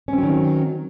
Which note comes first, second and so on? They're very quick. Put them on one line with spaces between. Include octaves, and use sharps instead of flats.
C#4 C4 F#3 D#3